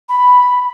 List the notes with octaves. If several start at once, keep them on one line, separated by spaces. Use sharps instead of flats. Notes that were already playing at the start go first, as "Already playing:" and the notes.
B5